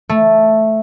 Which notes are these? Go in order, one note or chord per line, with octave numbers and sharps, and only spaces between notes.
A3